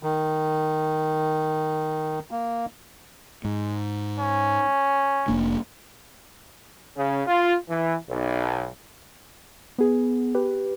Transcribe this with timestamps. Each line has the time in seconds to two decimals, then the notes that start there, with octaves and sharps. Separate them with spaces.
0.03 D#3
2.31 A#3
3.45 G#2
4.19 C#4
5.28 F1 A#3 D4
6.97 C#3
7.27 F4
7.69 E3
8.09 B1
9.78 B3 G#4
10.35 G4 B4